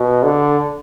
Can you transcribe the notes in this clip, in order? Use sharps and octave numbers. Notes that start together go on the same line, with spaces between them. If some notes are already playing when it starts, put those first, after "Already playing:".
Already playing: B2
D3